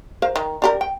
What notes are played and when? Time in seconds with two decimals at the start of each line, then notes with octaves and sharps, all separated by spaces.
0.22 A#4 C5 F5
0.36 D#3
0.62 D4 G4 A#4
0.81 G5